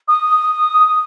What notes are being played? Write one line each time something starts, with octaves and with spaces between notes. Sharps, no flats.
D#6